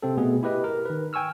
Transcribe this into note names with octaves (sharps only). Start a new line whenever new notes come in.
C3 C4 A4
B2 A3 B3 G#4
E4 G4 B4 D#5
A#4
D#3 B4
G5 G#5 C#6 E6 F6